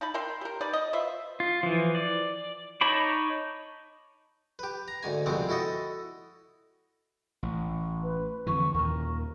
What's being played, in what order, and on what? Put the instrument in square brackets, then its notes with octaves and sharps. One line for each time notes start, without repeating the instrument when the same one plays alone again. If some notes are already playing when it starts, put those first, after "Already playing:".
[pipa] D#4 A5 B5
A#4 E5 G5 C6
G4 A#4
D#4 B4 D5
D#5
F4 B4 C5 E5
[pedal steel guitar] F4
E3 F3
D5
D#4 C#5 A5 B5 D6
[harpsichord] G4 B4
A#5
D2 G#2 G#5
C2 F2 B2 G#3 C4
E4 F#4 A4 D#5
[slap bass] A1
[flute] B4
[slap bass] F2 D3 E3 [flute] C#6
[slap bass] D#2 A#2 [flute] A#4